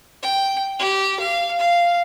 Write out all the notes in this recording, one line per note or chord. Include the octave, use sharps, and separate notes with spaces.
G5
G4
F5
F5